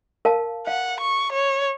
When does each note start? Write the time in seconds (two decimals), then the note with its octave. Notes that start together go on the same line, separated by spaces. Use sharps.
0.25 A#4 F5 A5
0.67 F5 F#5
1.00 C#6
1.33 C#5